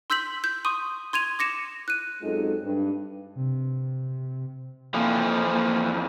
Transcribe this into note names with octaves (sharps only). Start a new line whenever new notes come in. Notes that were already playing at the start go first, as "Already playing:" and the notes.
C6 E6 G6 B6 F#7
G6
C6 C#6 D#6 D#7
C6 G#6 D#7 F7
D6 A#6 C#7 E7
F#6 D#7
F#2 G#3 C4 D#4 F4 A4
G2
C3
F2 E3 F3 A#3
A#3